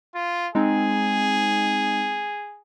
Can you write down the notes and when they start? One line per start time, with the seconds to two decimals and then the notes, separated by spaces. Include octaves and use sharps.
0.15 F4
0.55 G#3 C4 D#4 G#4